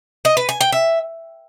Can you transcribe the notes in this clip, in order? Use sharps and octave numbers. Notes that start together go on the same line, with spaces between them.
D#5
B4
G#5
G5
E5